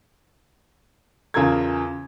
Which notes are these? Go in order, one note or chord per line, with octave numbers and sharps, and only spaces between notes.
E2 C#3 F4 A4 A#4 G#6